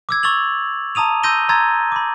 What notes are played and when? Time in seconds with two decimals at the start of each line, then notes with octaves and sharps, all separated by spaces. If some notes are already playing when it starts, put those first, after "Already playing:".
0.09 D6 E6 G#6
0.23 C#6 E6 A6 F7 F#7
0.95 A5 A#5 D#6 D#7 F7
1.23 C6 E6 G6 A#6 D#7 G7
1.49 A#5 C6 E6 G#6 A6
1.92 B5 D6